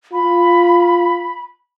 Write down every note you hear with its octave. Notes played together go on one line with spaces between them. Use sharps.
F4 B5